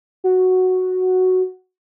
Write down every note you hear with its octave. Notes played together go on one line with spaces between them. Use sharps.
F#4